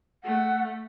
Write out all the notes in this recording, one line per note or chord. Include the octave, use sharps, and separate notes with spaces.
A3 F#5